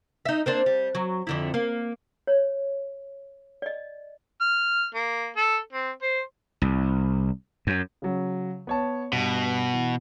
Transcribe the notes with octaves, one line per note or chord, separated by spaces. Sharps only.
D#4 E5
A#3 C4 D4
G3
F#3
F2 D3 E4
A#3
C#5
D5 D#5
F6
A#3
A4
C4
C5
C2
F#2
C#3 F#3
B3 C#5 A5
G2 B2
E3